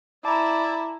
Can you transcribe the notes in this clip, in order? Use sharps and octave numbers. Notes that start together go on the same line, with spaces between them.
E4 D5 A5 A#5